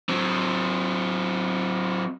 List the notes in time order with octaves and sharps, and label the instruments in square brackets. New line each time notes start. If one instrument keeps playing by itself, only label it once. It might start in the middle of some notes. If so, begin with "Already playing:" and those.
[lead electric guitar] F#3 C4